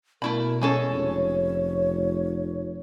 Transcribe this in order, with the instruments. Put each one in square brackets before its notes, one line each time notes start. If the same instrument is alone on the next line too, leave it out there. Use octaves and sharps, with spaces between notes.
[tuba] B2 [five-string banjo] A3 E4 B5 [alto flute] A#4
[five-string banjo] G#3 C#4 A4 [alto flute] C#5
[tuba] F1